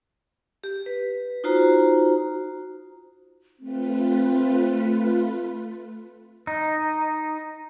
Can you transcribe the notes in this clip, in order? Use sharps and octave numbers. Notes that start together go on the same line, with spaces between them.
G4
B4
D#4 F4 F#4 C5 A#5
A3 C4 F4 B4
D#4